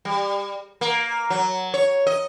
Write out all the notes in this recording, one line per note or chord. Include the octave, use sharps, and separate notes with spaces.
G3
A#3
F#3
C#5
D#5